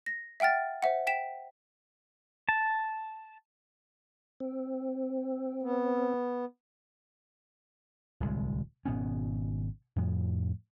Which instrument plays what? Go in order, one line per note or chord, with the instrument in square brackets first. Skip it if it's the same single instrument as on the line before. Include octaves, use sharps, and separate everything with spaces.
[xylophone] A#6
E5 F#5 G5 F6 A6
C5 E5 F#5
G5 B6 E7
[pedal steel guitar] A5
[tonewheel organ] C4
[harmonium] B3
[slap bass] D1 C2 G#3
G#1 B2 B3 C#4
F2 A2 F3